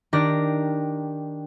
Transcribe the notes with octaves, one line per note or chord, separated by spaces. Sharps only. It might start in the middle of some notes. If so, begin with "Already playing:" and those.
D#3 D4 G4 A#4 D5 A#6